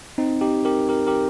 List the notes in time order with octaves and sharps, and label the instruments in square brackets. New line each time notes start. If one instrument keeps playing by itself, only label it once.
[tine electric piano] C4 D#4
D#4 G4
G4 A#4
G4 A#4
G4 A#4